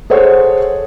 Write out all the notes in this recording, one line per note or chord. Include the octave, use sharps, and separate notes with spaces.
G#4 A4 C5 C#5 F#5